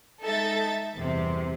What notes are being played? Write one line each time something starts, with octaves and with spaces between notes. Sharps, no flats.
G#3 D#4 A4 E5 A5 A6
E2 G2 C3